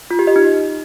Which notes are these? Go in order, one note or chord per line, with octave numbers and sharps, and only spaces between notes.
F4
G4
D#5
D#4